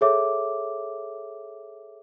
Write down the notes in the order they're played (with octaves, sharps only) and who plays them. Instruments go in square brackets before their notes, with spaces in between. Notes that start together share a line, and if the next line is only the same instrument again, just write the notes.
[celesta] G#4 A4 C#5 E5 D6